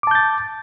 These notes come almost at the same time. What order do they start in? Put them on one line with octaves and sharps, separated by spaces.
D6 A5 G6 A6